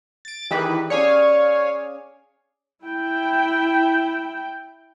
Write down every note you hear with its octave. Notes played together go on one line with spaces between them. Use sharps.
A6 D7
D#3 E3 G4 G#4 B4 G5
C#4 G#4 C#5 D5 F5 G#5
E4 G5